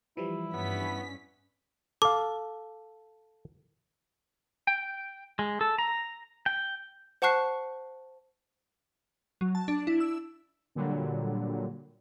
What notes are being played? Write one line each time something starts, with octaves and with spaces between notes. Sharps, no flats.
E3 F3 G3 E4
G2 B3 C#4 B6
A4 F5 D6
G5
G#3
A4
A#5
G5
C5 F#5 A5 C#6 F#6 C7
F#3
A5
D4
E4
E6
A#2 D3 F#3 G3